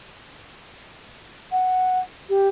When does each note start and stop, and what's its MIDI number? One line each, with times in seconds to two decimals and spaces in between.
1.52 1.99 78
2.29 2.48 67